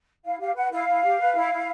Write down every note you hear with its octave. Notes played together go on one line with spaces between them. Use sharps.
E4 F5
G4 F5
B4 F#5
E4 F5
E4
G4
B4
E4
E4